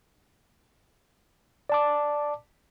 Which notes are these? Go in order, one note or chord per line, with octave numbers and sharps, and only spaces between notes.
D5 A5 D6